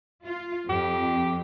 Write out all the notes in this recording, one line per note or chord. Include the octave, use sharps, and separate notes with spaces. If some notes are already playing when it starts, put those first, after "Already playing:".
F4
F2 G4